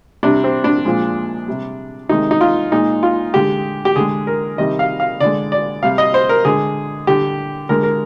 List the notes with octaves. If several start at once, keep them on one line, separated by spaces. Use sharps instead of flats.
C3 G3 D4
C4
D4
A#2 F3 G#3
C3 G3
C3 D#3 G#3 D#4
D#4
F4
A#2 G#3 D#4
F4
D3 G#3 G4
G4
D3 G#3 G#4
A#4
C3 D#3 G3 D#5
F5
F5
D3 G#3 D5
D5
C3 G3 F5
D#5
C5
A#4
D3 G#3 G#4
D3 G3 G4
D3 G#3 A#4
A#4